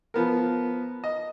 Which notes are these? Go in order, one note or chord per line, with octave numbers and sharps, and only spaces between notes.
F3 B3 A#4
D#5